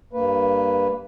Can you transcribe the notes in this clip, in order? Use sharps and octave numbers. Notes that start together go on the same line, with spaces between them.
G2 A#3 B4